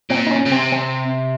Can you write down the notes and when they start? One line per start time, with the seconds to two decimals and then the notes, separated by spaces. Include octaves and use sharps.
0.10 A#2 C4
0.27 D#4
0.31 C#4
0.46 C#3
0.52 C3 C4
0.72 C4